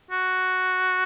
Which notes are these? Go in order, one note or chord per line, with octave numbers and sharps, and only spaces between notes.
F#4